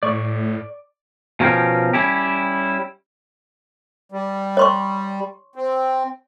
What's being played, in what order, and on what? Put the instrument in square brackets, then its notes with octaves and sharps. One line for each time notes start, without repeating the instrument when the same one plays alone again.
[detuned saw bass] A2 [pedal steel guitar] D5 C#6
[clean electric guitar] B2 F3 C#4 A#4 D#5 G5
G3 C#4 E4 G4
[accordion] G3
[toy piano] C#5 C6 C#6
[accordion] C4